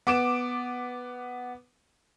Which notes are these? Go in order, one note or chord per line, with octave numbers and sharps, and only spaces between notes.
B3 D6 D7 E7